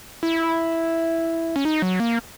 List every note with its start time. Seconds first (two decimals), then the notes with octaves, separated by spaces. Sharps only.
0.23 E4
1.56 C#4
1.65 D#4
1.82 F#3
2.00 A#3